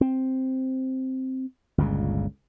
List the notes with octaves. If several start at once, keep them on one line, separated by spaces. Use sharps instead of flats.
C4
G1 C#2 A#2 C#3